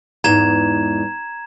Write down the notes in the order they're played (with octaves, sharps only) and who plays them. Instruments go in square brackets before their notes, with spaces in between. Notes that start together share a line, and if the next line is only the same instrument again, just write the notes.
[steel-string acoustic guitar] E2 G#2 [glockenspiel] A#5 G#6 E7